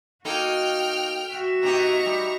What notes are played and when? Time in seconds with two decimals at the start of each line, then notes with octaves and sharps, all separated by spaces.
0.25 A#3 D#4 F#4 A4 G5 F6
1.31 F#4 E5
1.63 B2 D#4 G4 A#5 C#6
2.06 G3